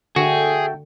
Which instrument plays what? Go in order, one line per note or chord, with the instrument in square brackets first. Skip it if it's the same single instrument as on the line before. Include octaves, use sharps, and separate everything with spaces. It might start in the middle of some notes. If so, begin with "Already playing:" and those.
[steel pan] D3 [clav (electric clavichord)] F#4 [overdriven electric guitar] G#4 [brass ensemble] A4 E5 G5